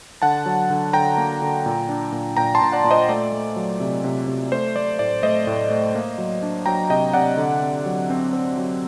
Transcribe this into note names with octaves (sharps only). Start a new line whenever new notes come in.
D3 F#5 A5
F#3
D3
D3 G5 A#5
A#3
D3
A#2
D4
A#2
A#2 G5 A#5
A5 C6
A#2
D5 F#5
A#2
C5 D#5
A3 D5
A3
F#3
C3
C3
C3
A3 C5
A3 D5
A2 D5
A3 C5 D#5
A2
A3
A#3
F#3
D4
F#3 G5 A#5
C3 D#5 G5
C3 D5 F#5
D3
C4
F#3
C4
C4
F#3